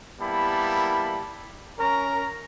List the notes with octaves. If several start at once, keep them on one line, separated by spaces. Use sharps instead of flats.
G3 A#3 B3 E4 A5 B5
C#4 A#4 A#5